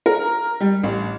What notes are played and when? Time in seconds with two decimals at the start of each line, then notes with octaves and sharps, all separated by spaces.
0.06 A#4
0.60 G3
0.83 A1